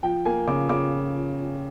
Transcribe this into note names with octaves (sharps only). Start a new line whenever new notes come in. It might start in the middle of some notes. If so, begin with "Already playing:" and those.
F3 G5
A#3 G#5
C#3 D6
C#3 D6